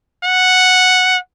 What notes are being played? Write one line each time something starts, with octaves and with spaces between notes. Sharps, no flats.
F#5